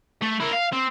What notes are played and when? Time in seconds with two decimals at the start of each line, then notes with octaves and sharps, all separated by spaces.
0.22 A3
0.40 E4 A#4
0.53 F5
0.73 C4